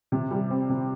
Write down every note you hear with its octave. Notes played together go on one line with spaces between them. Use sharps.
C3
G3
C4
C3